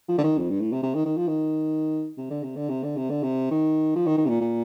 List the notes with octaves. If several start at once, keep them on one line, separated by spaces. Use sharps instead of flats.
F3
D3
D#3
F2
G2
A2
C3
C3
D#3
D#3
F3
D#3
C3
D3
C3
D3
C3
D3
C3
D3
C3
D#3
F3
D#3
D#3
C3
A#2
A#2